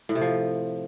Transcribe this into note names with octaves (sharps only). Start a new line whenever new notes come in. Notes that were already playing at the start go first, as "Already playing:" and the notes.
A2
C3
F3